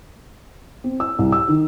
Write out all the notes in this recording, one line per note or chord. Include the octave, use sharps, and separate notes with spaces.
C4
E6
C2
E6
D#3